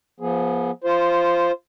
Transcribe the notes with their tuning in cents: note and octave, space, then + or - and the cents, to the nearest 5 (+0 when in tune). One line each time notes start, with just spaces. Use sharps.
F3 +0 B3 -30 G#4 +10
F4 -15 C5 +0